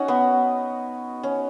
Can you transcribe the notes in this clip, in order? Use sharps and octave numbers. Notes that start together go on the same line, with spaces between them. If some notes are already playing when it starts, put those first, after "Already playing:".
Already playing: C#4 D#4 F#4
B3
C#4